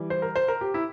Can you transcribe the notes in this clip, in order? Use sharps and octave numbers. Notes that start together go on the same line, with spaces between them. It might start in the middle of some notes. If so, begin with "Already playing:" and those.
Already playing: E3 G3
C5
A#4
C5
A#4
G4
E4